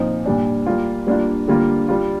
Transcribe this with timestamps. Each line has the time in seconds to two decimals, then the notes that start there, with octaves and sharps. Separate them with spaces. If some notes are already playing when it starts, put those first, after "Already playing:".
Already playing: A#2 F3 C4 D#4
0.26 A#2 G3 D4
0.66 G3 A#3 F4
1.07 G3 A#3 D4 F4
1.48 D3 G3 A#3 F4
1.89 G3 D4 F4